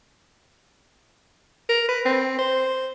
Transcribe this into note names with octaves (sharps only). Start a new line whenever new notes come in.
A#4
B4
C4
C5